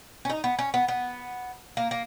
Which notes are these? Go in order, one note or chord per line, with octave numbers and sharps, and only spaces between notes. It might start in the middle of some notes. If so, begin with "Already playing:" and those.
C#4
D#4
B3
C#4
B3
B3
A#3
A#3